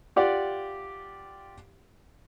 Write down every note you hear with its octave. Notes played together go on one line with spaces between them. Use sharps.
F4 G4 D5 F#5